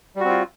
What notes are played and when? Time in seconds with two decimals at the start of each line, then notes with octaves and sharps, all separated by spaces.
0.16 G3
0.20 F#4
0.25 C4
0.29 F4